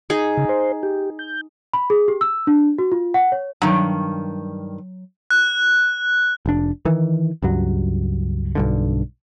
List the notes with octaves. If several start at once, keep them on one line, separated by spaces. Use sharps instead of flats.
D#4 G#4
C#3
C5
G4
G6
B5
G#4
G4
E6
D4
F#4
F4
F#5
C#5
G2 D#3 F#3
F#6
F1 D4
D#3 E3
C#2 G2 F#3
B1 G2 D3